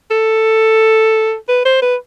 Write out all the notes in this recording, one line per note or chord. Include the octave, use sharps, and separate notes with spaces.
A4
B4
C5
B4